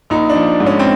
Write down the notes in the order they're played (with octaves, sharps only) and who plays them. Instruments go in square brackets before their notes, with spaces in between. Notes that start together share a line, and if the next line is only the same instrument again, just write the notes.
[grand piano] A#1 D#4
D4
F3
G#2
C#4
C4